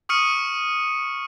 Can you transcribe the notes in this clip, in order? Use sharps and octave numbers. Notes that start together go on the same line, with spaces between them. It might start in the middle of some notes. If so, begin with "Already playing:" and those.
C#6 D#6 F6 C#7 D#7